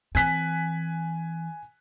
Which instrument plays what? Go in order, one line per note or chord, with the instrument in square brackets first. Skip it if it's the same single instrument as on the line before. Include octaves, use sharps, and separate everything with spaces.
[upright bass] E3 C4 [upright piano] G#5 F#6 B6